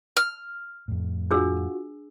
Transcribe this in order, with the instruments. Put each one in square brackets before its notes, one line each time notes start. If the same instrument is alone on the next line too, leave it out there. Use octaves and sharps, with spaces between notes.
[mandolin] F6
[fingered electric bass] F2 A2
[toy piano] D4 G#4 E6 [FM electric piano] F4 F#4